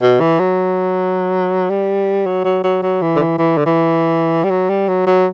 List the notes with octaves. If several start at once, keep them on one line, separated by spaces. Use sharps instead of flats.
B2
E3
F#3
G3
F#3
F#3
F#3
F#3
E3
D3
E3
E3
D3
E3
G3
F#3
G3
F#3
F#3